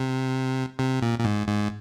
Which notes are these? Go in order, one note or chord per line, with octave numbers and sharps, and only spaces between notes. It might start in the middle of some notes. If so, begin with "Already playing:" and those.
Already playing: C3
C3
A#2
A#2
G#2
G#2